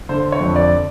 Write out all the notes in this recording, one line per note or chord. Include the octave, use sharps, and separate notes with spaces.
D3 C5
C#5
F2
D5